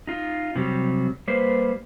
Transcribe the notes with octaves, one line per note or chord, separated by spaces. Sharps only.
D#4 F4
C3 E3 F#3 G3
G3 A#3 B4 C5